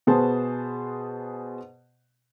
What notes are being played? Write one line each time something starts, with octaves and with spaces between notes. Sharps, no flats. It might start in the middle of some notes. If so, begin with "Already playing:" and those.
B2 B3 G#4 C5 A5